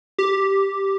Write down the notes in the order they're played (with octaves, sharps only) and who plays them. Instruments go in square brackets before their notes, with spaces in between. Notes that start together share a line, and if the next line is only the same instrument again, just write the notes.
[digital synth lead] G4